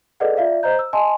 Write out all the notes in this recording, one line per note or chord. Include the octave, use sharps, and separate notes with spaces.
G#4 A4 B4 D5 D#5 F#5
F4 D5 E5 F5
C5 D#5 A#5 G6
E6
D#5 G#5 A5 C6